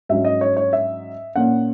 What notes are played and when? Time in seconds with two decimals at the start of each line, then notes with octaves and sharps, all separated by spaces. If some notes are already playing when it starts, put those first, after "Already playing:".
0.09 G#2 F#3 C#4 E5
0.25 D#5
0.41 C#5
0.57 C#5
0.73 E5
1.35 A#2 A#3 C#4 F#5